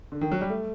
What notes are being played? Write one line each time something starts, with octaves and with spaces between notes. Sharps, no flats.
D3
D#3
F#3
G3
A3